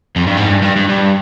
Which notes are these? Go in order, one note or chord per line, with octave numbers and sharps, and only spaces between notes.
F2
G2
G#2
G2
G2
G2
G2